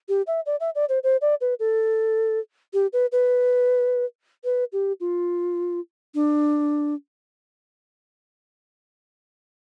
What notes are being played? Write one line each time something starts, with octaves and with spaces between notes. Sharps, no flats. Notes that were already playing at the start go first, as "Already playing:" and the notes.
G4
E5
D5
E5
D5
C5
C5
D5
B4
A4
G4
B4
B4
B4
G4
F4
D4